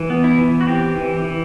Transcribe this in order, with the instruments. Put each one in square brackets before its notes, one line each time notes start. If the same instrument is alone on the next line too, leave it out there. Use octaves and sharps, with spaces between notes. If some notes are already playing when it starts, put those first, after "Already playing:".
Already playing: [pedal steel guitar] E3
B3
E4
E3
F#4
C4 G4
E3
E3